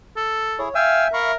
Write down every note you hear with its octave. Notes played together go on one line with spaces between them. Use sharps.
A4
E4 G#4 C#5
E5 F5 G5 G#5 E6
A#4 F5 B5 C#6